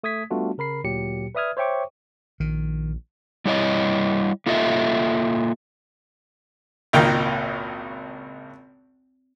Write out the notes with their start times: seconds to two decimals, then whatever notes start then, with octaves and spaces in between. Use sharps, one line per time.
0.04 A3 D#6 G#6 B6
0.31 G3 A3 B3 D4 F4 F#4
0.58 C#3 A#4 B5 C7
0.84 D2 A#2 F#3 G4 C#7
1.35 B4 D5 E5 D#6 F6 G#6
1.57 C5 C#5 E5 G5 C#6 D6
2.40 A#1 D#3
3.46 G3 E4 C#5 D#5
4.46 A#3 F4 A4 D#5 E5
6.93 G#1 C#2 A#2 D#3 G5